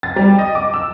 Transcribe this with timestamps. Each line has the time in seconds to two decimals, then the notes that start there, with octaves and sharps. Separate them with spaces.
0.03 A6
0.16 G3
0.39 D#5
0.55 D6
0.74 E6